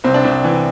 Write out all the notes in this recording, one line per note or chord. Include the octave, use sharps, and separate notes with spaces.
C2 C4
D4
C2 C4
E3